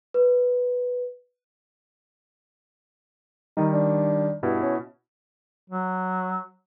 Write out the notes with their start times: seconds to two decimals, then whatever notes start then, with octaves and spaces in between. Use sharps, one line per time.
0.14 B4
3.57 D#3 G3 D#4
3.73 D4
4.43 G2 B2 E4
4.62 C#4
5.70 F#3